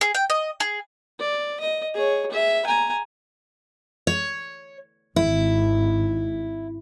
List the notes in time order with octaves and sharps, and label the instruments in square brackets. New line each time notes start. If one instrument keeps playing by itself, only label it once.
[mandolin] G#4
G5
D#5
G#4
[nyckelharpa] D5
D#5
G#4 C#5
G#4 E5
G#5 A#5
[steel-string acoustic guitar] C#5
[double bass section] G#1 [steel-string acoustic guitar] E4